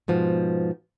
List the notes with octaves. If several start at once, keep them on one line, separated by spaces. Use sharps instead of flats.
G#2 B2 F3